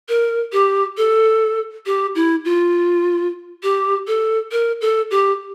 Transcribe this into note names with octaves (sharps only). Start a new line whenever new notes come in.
A#4
G4
A4
G4
E4
F4
G4
A4
A#4
A4
G4